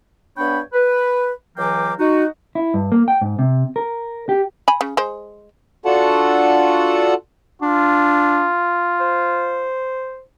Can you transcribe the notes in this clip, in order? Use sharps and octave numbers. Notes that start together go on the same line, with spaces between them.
G2 B3 D4 C#5 G5 B5
B4
C#2 E3 F#3 A#3 G5 D6
D#4 F#4
E4
G2
A#3
G5
G#2
C3
A#4
G4
G#5 B5
C#3
G#3 C5
D4 F4 F#4 A4 F#5 A5
D4 F4
C5